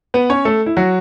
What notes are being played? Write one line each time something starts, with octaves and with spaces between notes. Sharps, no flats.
B3 B4
C#4 C#5
A3 A4
E4
F#3 F#4